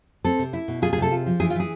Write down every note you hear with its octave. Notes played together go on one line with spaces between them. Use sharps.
C4 A4
C3
E4
B2
F4 G#4
G#4
C3 A4
F4
F3
E3 G#4
F4
E3 G#4